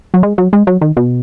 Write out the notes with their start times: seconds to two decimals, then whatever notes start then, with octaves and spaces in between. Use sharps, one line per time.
0.14 F#3
0.23 G#3
0.38 F#3
0.53 G#3
0.67 F#3
0.81 D#3
0.97 B2